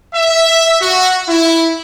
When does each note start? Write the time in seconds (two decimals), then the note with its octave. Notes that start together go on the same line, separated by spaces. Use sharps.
0.14 E5
0.81 F#4
1.28 E4